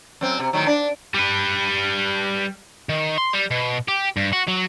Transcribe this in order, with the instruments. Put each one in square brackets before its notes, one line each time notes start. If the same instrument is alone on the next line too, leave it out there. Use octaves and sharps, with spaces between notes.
[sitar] F#2 C4
C3
A2 D#3 F#3
D4
[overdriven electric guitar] G3 B4
[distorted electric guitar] D#3
C6
G3
B2
G4
G2
F#4
F#3